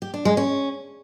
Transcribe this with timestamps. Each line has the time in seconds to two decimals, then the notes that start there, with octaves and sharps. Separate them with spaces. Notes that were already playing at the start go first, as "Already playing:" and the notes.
0.02 G4
0.14 D4
0.25 G#3
0.37 C#4